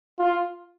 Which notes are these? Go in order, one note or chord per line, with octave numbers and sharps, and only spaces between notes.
F4